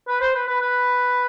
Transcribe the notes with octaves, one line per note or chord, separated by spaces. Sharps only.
B4
C5
B4
B4
B4